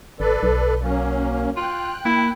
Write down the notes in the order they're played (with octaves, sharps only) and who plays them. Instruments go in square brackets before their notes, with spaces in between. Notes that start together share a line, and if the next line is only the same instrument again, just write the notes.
[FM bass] G#1 [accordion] A4 B4 D5
[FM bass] B1
[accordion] F#3 A#3 C#4
[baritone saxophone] F4 [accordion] G5 F#6
[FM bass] A#3 [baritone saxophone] E4